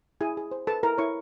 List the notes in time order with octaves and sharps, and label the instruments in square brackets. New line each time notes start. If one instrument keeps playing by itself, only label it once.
[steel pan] E4 G#4 G#5
G#4
C5
A4 B4 A5
E4 A#4 A#5
E4 C#5 C#6